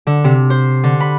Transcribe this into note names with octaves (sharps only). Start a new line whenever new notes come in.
D3
C3
C5
D3
B5